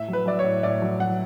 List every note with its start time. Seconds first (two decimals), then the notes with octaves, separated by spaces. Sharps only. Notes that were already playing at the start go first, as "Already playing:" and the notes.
Already playing: A2 E5
0.08 F#3 B4
0.26 F#3 D5
0.39 C#5
0.44 A2
0.63 A2 D5
0.82 F#3
1.00 F#3 F#5